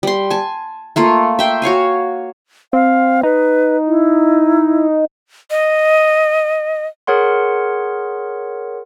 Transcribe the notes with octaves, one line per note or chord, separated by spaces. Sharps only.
G3 C6
G#5 A5
A3 A#3 F4
E5 G5 C6
F#4 C#5 F5 G#5
C4 F5
D#4 B4
E4
D#5
G#4 A#4 C#5 F#5 C6